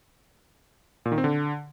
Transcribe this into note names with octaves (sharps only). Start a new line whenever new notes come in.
A#2
D#3
C4
D3